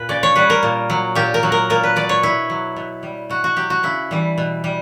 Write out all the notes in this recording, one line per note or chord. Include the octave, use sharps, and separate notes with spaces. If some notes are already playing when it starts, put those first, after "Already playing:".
Already playing: A#2 B4
C#3 D5
C#5
G3 B4
A#4
A#2
F#3
A#2 G4
A#4
F#3
A#4
A#2 A#4
B4
F#3 D5
C#5
B2 E4
F#3
B2
G3
B2 F#4
F#4
F#3 G4
F#4
C#3 E4
E3 G3
B2
G3